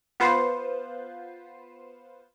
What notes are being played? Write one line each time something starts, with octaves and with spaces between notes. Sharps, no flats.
B3 F4 B4 C5